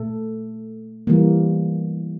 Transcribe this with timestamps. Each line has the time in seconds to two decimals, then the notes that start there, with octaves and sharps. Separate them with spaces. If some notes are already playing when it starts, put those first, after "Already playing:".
Already playing: A#2 A3 A4
1.07 E3 G3 A#3